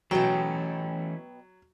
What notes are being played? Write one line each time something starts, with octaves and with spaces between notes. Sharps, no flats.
B2 E3 F#3 G#3 A3 C#4 G5